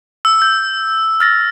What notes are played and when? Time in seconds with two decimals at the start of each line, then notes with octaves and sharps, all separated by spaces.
0.25 E6
0.42 G6
1.20 F6 A6 A#6